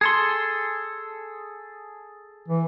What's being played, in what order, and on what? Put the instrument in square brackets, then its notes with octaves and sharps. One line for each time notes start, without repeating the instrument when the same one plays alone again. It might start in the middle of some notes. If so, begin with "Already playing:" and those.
[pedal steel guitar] G#4 A4 C6
[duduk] E3